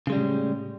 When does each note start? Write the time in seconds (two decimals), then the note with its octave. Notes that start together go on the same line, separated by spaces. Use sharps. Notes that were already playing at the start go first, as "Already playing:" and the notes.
0.07 C#3
0.10 G#3
0.12 G3
0.15 A2